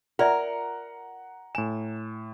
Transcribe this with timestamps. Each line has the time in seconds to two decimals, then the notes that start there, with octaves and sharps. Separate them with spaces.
0.19 F4 A#4 D5 E5 F#5 A#5
1.55 A2 G#5 E7